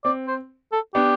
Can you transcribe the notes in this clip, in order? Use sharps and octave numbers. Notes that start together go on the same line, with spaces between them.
C4 D5
C5
A4
B3 D4 G4